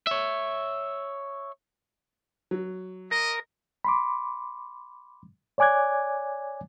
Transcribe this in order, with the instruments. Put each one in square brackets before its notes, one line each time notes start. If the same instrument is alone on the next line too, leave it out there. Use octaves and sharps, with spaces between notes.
[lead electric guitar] C#5 E5
[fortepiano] F#3
[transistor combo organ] A#4 [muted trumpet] D#5
[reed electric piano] B5 C6 D6
C#5 D5 G#5 D6 F#6 G#6